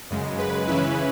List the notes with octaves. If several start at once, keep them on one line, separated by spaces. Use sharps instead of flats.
F#2 C#3 G#3
B4
C#3 E3 C#4 E4 B4